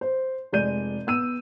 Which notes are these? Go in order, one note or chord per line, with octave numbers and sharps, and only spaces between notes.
C5
F1 G#3 D5 G6 D#7
B3 E6 D#7